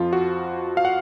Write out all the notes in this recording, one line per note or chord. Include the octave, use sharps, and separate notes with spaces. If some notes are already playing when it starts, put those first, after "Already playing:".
Already playing: F2 F3 F4
F#4
F5
F#5